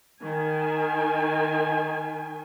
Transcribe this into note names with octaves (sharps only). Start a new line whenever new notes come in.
D#3 G#5